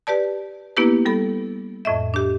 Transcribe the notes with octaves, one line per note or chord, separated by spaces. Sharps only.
G4 B4 D5 A5
A#3 B3 D4 E4 G4 B4
G3 A4 B5
F2 A2 D#5 E5
D4 G4